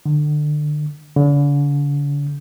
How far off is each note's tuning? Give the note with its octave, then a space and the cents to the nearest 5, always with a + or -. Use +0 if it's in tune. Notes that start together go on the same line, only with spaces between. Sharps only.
D3 +25
D3 -45